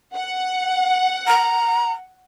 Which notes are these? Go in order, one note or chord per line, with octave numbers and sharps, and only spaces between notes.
F#5
A#5